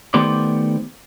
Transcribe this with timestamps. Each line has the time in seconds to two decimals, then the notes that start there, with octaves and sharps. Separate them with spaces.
0.14 D#3 A3 B3 G4 C5 D5